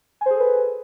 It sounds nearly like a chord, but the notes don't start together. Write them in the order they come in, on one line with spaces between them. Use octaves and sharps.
G#5 C5 G#4 A4 B4